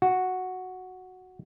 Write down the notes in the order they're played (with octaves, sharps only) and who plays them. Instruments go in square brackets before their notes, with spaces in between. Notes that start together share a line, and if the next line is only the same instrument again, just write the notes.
[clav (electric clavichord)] F#4